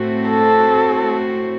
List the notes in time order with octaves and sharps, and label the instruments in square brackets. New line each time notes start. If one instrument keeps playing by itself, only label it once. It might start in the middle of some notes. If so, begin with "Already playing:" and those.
Already playing: [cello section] A2 A3 C4 F#4
[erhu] A4